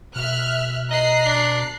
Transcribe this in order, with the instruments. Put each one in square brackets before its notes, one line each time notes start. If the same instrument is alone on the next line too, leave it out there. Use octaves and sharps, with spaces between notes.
[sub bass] B2 [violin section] E5 F6 F#6
[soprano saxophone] D#5 [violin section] A#5 F#6 C7
[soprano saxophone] D4